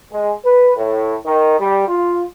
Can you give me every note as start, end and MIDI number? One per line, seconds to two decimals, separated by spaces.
0.11 0.32 56
0.44 0.70 71
0.76 1.15 45
1.24 1.55 51
1.58 1.84 55
1.87 2.22 65